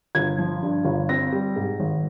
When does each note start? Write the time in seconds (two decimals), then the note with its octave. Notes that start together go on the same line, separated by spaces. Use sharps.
0.15 G1 G#6
0.38 F3
0.62 G2
0.85 G1
1.09 C4 A#6
1.32 G3
1.56 G#2
1.79 G#1